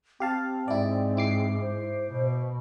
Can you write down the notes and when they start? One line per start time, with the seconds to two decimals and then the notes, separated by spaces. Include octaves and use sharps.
0.20 C4 G4 F5 A5
0.68 G#2 E4 D5
1.17 E4 D6 C7
1.62 C5
2.11 B2